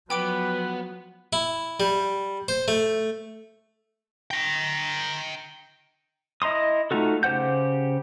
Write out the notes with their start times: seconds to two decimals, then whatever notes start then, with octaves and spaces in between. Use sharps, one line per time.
0.10 F3 F#3 B3 B4 G5 D6 D7
1.33 E4
1.80 G3
2.48 C5
2.68 A3
4.31 G5 A#5
6.42 E4 D#5 A#5 C6 D#6
6.91 A3 D#4 F4 F#4 A4
7.23 C#3 G4 C5 F#5 G6